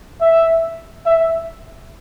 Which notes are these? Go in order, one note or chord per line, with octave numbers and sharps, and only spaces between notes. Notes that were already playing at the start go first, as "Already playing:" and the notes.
E5
E5